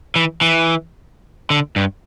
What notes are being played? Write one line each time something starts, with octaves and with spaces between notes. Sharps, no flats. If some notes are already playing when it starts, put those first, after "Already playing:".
E3
E3
D3
G2